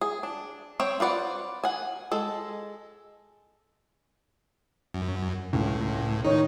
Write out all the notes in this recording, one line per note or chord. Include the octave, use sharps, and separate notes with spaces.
G#4
D4
C4 C#5 G5
F4 B4 D5 F#5
F#5 G#5
G#3 A4
F#2
C#2 A2
D#3 D#4 C#5